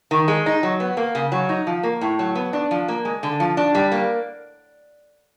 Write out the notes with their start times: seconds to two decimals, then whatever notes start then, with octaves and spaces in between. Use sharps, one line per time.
0.11 D#3
0.28 G#3
0.46 D#4
0.63 F#3
0.80 B3
0.97 A#3
1.15 C#3
1.32 F#3
1.49 D#4
1.67 F3
1.83 A#3
2.01 A2
2.19 F#3
2.35 B3
2.53 D4
2.71 F3
2.88 A#3
3.05 G#3
3.23 D3
3.40 F3
3.57 D4
3.75 G3
3.92 A#3